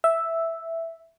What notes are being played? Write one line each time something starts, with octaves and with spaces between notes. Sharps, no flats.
E5